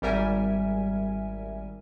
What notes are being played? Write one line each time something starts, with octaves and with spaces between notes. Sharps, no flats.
G#1 G3 A#4 E5 G#5